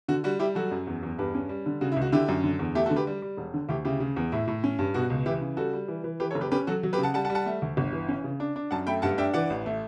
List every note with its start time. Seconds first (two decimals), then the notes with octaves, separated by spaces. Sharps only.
0.08 D3 F#4
0.24 G3 F#4
0.39 G3 E4 G4
0.55 F#3 F#4 A4
0.71 F#2
0.87 E2
1.03 E2
1.18 G2 G4 B4
1.35 C#4
1.49 G3
1.66 D3
1.81 C#3 F#4
1.92 E4
1.96 C#2
2.02 F#4
2.12 D3 E4 G4
2.28 F#2
2.44 D3
2.59 E2
2.75 A3 E4 G4
2.86 F#4 A4
2.90 D3
2.96 G4 B4
3.07 G3
3.22 G3
3.37 E1
3.54 D3
3.69 D2 E4 G4
3.85 C#3 E4 G4
4.00 C#3
4.16 E2
4.32 A2 E4
4.48 A2
4.64 C#4
4.79 G2
4.94 B2 F#4
5.10 C#2
5.26 E3 E4 G4
5.42 C#3
5.57 G3 F#4 A4
5.73 G3
5.88 E3
6.04 E3
6.20 E3 G4 B4
6.31 A4 C#5
6.35 F#1
6.41 G4 B4
6.52 C#4 G4 B4
6.67 F#3 F#4 A4
6.83 F#3
6.93 G4 B4
6.98 C#3
7.03 F#5 A5
7.14 G3 F#5 A5
7.25 F#5 A5
7.30 G3
7.35 F#5 A5
7.46 A3
7.62 D2
7.77 G1
7.92 E3
8.08 C#4
8.24 C#3
8.40 D4
8.56 D4
8.71 F#2 F#5 A5
8.87 A3 G5 B5
9.02 G2 F#5 A5
9.18 D4 E5 G5
9.34 E3 D5 F#5
9.50 A1
9.66 A3